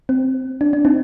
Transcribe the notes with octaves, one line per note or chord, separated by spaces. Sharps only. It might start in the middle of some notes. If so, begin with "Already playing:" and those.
C4
D4
D4
C4 D#4